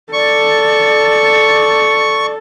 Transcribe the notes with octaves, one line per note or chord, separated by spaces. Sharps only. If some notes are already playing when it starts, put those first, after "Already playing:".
A4 D5 C#6